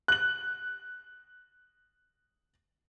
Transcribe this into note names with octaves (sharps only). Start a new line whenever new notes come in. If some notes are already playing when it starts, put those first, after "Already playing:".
F#6 F#7